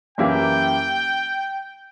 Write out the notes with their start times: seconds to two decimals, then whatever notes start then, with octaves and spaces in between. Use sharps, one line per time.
0.18 F#2 E3 A#3 E4 G4 G5